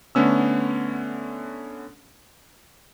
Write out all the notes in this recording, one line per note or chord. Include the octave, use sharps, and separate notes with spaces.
D3 A3 B3 C#4 E6